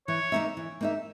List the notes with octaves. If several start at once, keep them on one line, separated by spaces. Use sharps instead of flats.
E3 C#5
A#3 D#4 A#4 E5
E3
A#3 D#4 A#4 E5